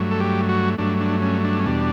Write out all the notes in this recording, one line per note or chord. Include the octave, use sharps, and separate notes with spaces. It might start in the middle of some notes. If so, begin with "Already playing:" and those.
Already playing: G2 F#3 A3
A4
G4
F#4
G2 F#3 A3 D4
D4
C#4
D4
C#4
E2 B2 G3 D4